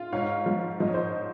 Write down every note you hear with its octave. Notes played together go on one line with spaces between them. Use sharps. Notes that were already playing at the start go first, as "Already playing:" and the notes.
Already playing: F4
G#2 C#5 F5
F3
F3 D#5
C#5
C5 D#5